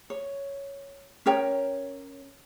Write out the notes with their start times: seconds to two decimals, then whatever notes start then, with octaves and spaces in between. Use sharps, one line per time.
0.10 C#5
1.26 C#4 A#4 C#5 G5